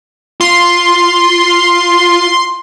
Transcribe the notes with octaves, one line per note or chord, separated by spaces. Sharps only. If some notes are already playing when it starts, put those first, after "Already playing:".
F4 C6